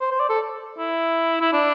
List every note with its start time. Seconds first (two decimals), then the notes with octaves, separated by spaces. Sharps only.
0.01 C5
0.11 C5
0.20 D5
0.29 A4
0.78 E4
1.41 E4
1.53 D4